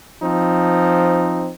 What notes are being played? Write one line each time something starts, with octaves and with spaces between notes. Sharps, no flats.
F3 C4 D#4